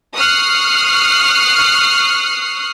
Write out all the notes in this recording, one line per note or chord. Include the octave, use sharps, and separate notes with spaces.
C#6 D#6 F6 F#6 C7